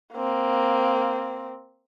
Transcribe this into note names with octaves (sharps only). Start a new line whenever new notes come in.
A#3 C4